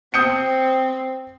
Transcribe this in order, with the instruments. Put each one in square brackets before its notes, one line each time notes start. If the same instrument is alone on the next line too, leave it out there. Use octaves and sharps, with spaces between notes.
[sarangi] C4 [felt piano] D#6 G6 C#7